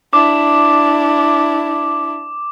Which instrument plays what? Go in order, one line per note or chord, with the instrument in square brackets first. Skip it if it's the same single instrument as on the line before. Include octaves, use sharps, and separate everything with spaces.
[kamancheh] D4 E4 [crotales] D6